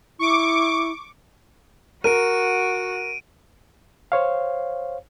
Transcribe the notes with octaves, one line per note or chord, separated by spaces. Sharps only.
E4 C#6 D6
F#4 A#4 D7 D#7
C5 C#5 F5